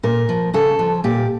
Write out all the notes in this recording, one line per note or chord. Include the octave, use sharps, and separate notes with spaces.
A#2 A#4
F3
C#3 A4
F3
A#2 G4